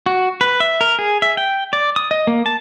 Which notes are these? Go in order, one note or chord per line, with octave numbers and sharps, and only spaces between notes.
F#4
B4
E5
A#4
G#4
E5
G5
D5
D#6
D#5
A#3
A5